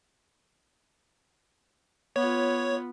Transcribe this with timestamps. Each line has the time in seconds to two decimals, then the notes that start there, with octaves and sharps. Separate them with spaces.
2.16 B3 F4 C#5